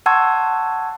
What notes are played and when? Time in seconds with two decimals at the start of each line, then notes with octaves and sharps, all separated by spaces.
0.06 F#5 A5 C6 C#6 E6 G#6